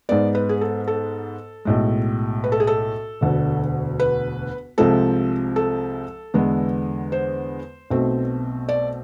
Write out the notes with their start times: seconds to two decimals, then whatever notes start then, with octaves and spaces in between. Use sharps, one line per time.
0.09 G#2 G#3 B3 D5
0.35 B4
0.49 G#4
0.61 A4
0.88 A4
1.65 B1 A2 G#3
2.44 B4
2.52 A4
2.60 G#4
2.67 A4
3.21 E1 D2 D3
4.00 B4
4.78 C2 C3 F3 G#3 C4 A4
5.56 A4
6.34 E2 D3 G#3 B3
7.12 C5
7.91 B1 B2 A3 C4
8.69 D5